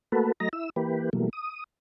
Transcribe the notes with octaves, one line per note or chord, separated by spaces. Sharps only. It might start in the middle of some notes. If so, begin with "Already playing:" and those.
A3 A#3 F#4 A4 B4
F#3 A3 D#5 A#5 A#6
E4 E6
E3 A#3 G4 B4
B2 E3 F#3 G3 A3 A#3
D#6